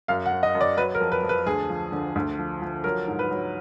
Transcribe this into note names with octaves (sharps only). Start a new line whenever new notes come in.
F#2 F5
F#5
F#2
D#5
F#2
D5
F#3 B4
A#4
F2
B4
F2
B4
D2 G#4
F3
D3
D2
F3
F3
F#3 A#4
G#2
B4
F#3